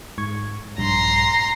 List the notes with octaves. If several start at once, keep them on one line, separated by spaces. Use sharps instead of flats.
G#2 C#6 G#6
A#1 G2 A#5 C6